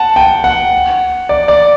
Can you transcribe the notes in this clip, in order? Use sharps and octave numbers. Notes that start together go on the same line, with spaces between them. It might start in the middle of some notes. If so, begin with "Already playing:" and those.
Already playing: F#5 A5
G5
F#5
D5
D5